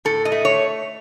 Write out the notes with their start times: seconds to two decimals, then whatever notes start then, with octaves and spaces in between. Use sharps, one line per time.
0.05 A2 A4
0.25 D#5
0.32 A3
0.45 C#5